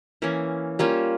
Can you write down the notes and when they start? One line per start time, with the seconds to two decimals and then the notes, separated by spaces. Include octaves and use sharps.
0.22 E3 A#3 C#4
0.79 G3 A#3 C#4 F4